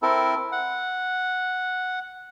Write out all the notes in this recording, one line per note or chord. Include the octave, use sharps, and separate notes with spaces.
C4 E4 A4 A#4
F#5